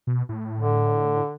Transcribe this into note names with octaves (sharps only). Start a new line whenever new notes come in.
B2
A2
D3